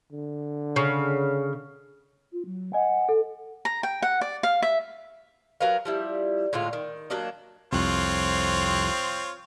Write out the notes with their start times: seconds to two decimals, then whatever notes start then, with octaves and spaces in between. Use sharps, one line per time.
0.12 D3
0.76 C#3
2.32 F4
2.45 F#3
2.73 D#5 F#5 G#5
3.09 A4
3.65 A#5
3.83 G5
4.02 F#5
4.21 D5
4.43 F5
4.62 E5
5.60 F#3 A#4 B4 F5
5.85 F3 G3 E4
6.53 A2 D3 G#3 F4
6.73 D#3
7.10 F#3 A#3 D4 D#5
7.72 C2 F2 C4 F4 C#5 F#6